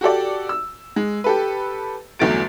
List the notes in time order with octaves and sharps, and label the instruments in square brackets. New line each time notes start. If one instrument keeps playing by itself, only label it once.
[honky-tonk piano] F#4 G4 A4 D5
E6
G#3
G4 A4 B4
G1 E2 F#3 A3 A6 D7